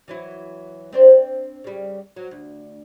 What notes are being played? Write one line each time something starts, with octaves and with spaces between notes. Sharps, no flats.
E3 F#3 E4
C4 D4 C5
C#3 G3
F#3
D2